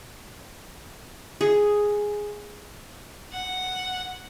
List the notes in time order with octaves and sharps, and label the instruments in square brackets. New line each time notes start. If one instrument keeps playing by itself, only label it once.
[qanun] G#4
[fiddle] F#5